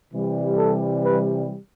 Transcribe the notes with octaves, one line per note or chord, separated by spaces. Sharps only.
C3 E3 G3
A4
B4